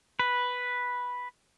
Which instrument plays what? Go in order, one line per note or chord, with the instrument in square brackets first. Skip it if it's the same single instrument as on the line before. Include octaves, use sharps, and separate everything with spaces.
[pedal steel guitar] B4